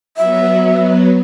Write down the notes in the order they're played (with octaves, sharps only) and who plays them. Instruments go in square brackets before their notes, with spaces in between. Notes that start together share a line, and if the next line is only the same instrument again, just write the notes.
[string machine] F#3 B3 [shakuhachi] E5